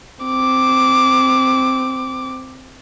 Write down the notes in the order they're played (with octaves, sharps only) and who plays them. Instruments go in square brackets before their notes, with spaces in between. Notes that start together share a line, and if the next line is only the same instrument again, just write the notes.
[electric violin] C4 D6